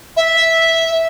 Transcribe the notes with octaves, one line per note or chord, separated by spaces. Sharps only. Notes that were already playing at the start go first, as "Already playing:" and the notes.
E5